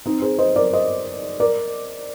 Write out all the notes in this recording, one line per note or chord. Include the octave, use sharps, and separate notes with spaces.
C4 D#4
G#4 C5
C5 D#5
A#4 D5
C5 D#5
A#4 D5